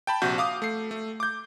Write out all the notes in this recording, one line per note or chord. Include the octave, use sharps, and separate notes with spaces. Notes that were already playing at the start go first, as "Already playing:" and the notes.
G5 A5 B5
A#1 C3 F#4 G6
F5 D6 D#6
A3 C7
A3
D6 G6